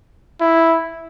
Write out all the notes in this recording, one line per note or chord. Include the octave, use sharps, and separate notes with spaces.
E4